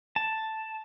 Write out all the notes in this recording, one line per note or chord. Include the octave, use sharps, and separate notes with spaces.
A5